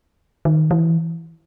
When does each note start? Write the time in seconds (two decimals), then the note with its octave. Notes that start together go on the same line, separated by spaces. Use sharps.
0.45 D#3
0.71 E3